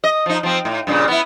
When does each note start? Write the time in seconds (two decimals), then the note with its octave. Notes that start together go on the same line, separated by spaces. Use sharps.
0.04 D#5
0.26 F3 D#4
0.43 F3 C4
0.65 A2
0.87 G2 A#2 C#3
1.08 B3 E4